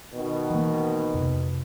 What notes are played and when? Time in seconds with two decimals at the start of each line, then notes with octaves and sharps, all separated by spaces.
0.14 B2 D#3
0.50 E3 A#3
1.14 F2 C3